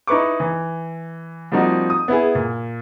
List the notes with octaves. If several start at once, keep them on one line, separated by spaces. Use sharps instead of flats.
D#4 E4 B4 C#6 D6
E3
F3 G3 A#3 C4 D#4 F#4
D#6
B3 E4 G#4
A#2